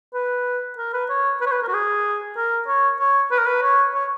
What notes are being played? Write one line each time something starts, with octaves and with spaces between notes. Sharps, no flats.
B4
A#4
B4
C#5
B4
C#5
B4
A#4
F#4
G#4
A#4
C#5
C#5
B4
A#4
B4
C#5
C#5